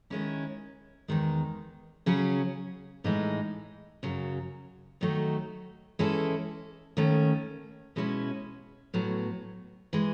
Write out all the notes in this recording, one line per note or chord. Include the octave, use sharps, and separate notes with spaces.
D#3 G#3 C#4 E4
E2 D#3 G#3
C#3 F#3 C#4 G#4
A2 E3 G#3 D#4
F#2 C#3 F#3
D#3 F#3 A3 D#4 F#4
E3 G#3 C#4 E4 A4
D#2 D#3 A3 C#4
B2 G#3 C#4 E4 B4
A2 F#3 B3
E3 G#3